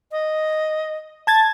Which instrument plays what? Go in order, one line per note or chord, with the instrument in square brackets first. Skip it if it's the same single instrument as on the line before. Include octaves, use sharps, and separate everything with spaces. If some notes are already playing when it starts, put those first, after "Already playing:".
[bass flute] D#5
[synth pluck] A5 G#6 A6